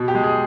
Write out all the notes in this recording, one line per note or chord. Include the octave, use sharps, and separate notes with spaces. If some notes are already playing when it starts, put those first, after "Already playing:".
Already playing: B2
G4
G#3
G#4